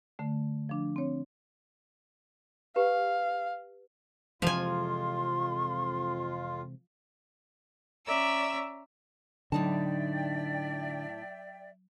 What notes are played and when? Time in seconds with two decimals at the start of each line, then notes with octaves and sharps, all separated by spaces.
0.19 D3 A3
0.69 F3 D4
0.96 C4 C#5
2.76 G4 B4 F5
4.42 F2 C3 E3 F3 G#3 F4 G#5 C6
8.06 C#4 D5 E5 A#5 E6
9.52 A2 D3 F#3 D#4 D5 E5 G5 A5